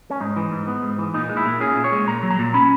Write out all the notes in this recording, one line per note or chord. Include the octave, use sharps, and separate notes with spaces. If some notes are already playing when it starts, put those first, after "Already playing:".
C#4
G#2 D#4
E3
G#2
B3
G#2
E3
A#2 D#4
G#3
E4
A#2
C#4 G#4
A#2
C#5
G#3
A#2 A#5
F#3
A#5
A#2
C#4 B5